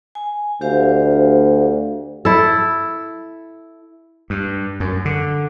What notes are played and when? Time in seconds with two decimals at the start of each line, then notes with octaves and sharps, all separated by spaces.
0.15 G#5
0.61 D2 G4 C5 F5
2.25 E4 A4
4.30 G2
4.80 F#2
5.05 D3